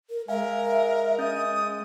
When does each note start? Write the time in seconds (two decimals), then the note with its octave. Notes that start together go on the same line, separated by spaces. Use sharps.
0.10 A#4
0.28 G#3 A#4 E5 F5 G#5
1.18 C#4 D#6 G6 A6